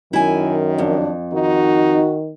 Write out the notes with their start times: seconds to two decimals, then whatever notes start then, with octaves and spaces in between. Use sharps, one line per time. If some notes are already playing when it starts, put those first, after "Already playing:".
0.13 F#2 D#3 E4 G#5
0.78 F2 D4
1.33 D#3 D#4 F#4